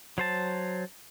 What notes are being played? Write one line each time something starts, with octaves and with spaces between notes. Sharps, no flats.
F#3 C5 A5